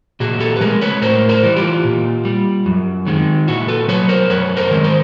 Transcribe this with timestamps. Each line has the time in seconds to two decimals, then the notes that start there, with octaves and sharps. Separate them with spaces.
0.20 A#2 F#4 G#4
0.40 G4 A4
0.56 B4
0.60 F3 G#3 G#4 A#4
0.81 B4 C#5
1.02 A2 A#4 C5
1.29 A#4 C5
1.43 E3 G3
1.56 F4 G4
1.84 A#2
2.25 G3
2.66 F#2
3.07 D#3 G#3
3.47 A#2 E4 F#4
3.68 A4 B4
3.88 F#3 B4 C#5
4.09 A#4 C5
4.30 F#2 B4 C#5
4.57 A#4 C5
4.71 D#3 G#3
4.84 A#4 C5